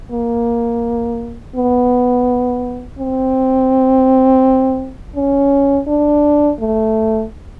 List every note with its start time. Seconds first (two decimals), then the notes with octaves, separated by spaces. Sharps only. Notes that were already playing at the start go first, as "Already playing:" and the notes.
0.12 A#3
1.56 B3
2.99 C4
5.16 C#4
5.87 D4
6.60 A3